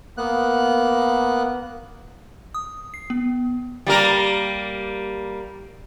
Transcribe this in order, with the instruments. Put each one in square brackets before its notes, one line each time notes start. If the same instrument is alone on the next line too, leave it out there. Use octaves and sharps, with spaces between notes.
[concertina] A#3 B3 F#6
[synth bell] D#6
C7
B3
[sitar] G3 A#3 A#4